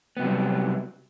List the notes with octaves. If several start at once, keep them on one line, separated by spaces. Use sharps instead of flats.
C3 F#3 G3 B3